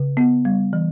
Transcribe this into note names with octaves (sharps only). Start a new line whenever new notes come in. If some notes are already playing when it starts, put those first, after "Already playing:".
Already playing: C#3
B3
G3
E3